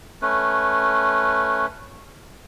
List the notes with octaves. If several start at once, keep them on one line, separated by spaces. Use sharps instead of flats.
A3 C#4 B4